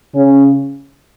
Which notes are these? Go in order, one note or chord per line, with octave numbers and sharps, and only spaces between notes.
C#3 C#4